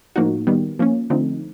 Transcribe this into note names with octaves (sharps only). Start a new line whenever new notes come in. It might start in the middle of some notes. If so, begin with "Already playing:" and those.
A2 F3 A#3 D#4 F#4
D#3 G3 B3
F3 A#3 C#4
D3 F3 A3 C4 D#4